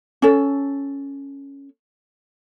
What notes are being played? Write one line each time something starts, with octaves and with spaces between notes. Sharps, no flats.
C#4 A4